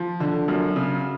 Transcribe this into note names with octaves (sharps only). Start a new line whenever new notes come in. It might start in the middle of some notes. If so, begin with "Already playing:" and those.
Already playing: F3
D3
F#2
C#3